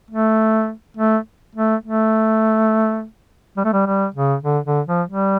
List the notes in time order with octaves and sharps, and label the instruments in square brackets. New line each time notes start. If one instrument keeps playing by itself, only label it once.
[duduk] A3
A3
A3
A3
G3
A3
G3
G3
C#3
D3
D3
F3
G3